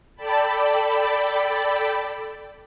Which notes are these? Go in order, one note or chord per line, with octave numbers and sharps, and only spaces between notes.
A4 D5 G5 A5 B5